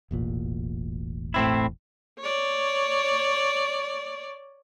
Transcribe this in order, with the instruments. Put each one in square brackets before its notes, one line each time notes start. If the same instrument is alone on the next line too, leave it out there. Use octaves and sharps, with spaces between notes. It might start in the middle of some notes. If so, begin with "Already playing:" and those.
[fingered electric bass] E1 A1 A#2
[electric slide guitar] A2 C4 E4
[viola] C#5 D5